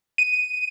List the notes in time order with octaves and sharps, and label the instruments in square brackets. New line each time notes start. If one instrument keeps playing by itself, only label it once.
[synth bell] D#7